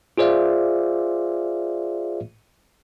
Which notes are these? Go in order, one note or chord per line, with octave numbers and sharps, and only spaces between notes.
F4 G#4 C5 D5 E5 F5